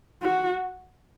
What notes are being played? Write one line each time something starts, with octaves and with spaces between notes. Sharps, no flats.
F#4